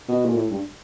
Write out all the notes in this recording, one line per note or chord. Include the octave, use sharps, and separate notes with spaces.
B2
A#2
A2
G2